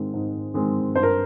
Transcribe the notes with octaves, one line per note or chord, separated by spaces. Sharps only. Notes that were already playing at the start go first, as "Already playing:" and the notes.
Already playing: G#2 D#3 G#3 C4
G#2
D#3 G#3 C4
G2 C5
A#4